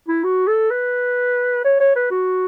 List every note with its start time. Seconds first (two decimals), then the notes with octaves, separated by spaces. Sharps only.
0.08 E4
0.24 F#4
0.47 A4
0.70 B4
1.64 C#5
1.80 C#5
1.96 B4
2.11 F#4